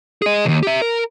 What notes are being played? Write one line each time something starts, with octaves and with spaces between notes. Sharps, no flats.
G#4 D#5
D#2 C#3
G4 E5
A#4